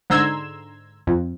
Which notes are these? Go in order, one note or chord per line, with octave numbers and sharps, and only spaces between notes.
G#2 D3 A#5 C6 E6 G#6
F2